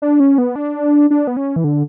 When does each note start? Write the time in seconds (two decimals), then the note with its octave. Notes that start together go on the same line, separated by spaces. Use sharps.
0.02 D4
0.20 C#4
0.38 B3
0.56 D4
1.11 D4
1.27 B3
1.37 C#4
1.56 E3
1.64 D3